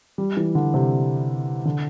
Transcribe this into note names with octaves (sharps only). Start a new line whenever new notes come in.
G3
E3
D3
C3
D3